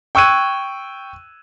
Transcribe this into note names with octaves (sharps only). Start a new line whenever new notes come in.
G5 C#6 E6 F#6 G#6 D#7